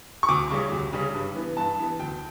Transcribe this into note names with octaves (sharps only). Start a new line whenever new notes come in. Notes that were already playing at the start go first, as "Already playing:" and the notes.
C#6
D2 D6
C#3 G3 C#4
D2
C#3 G3 C#4
G2
E3 B3
G2 A5
E3 B3
D2 G5